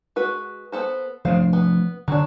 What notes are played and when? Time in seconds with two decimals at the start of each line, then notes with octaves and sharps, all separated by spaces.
0.16 G#3 F#4 B4
0.72 B3 A4 C5
1.25 F3 A3 D4 C5 F5
1.53 B3
2.08 D3 F#3 D4